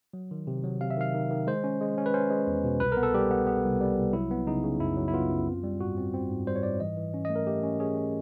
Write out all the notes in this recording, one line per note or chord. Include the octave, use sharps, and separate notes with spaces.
F#3
D#3
C3
F#3
C3 F5
E5
D#3 F5
D#3
D#3
G#3 C5
C#4
G#3
C#4
B4
C#4 C5
G#3
E2
B2
C2 B4
A#4
B3
A4
G3 G4
B3
B3
C2
G3
C2
F#3 E4
B3
C#3 D#4
C#3
F#2 E4
F#3
E4
B3 F4
F#2
C4
G3
G#2 F#4
C4
C4
G#2
G3 C5
C#5
G#2 D5
E3 D#5
E3
C#4
D#5
A3
A#4
A3 G4
C#4
C#4 G#4
C#4